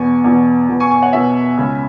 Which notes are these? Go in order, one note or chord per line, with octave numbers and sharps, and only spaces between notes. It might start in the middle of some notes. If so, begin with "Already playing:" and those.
Already playing: E2 B2 B3 G#5 C#6
E2 B2 B3
B2 B3
G#5 C#6
G#5 C#6
C#5 F#5
B2 B3 E5 G#5
C#2 C#3 G#3 C#4